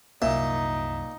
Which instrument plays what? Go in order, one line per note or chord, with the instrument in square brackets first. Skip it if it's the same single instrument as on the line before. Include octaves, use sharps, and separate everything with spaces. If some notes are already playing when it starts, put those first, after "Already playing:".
[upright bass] C2 F#2 [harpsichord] A#2 [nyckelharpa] D#4 [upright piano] E5